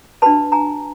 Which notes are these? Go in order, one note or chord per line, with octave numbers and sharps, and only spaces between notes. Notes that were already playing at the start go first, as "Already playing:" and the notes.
D4 F#4 B4 A5 B5
G#5 A#5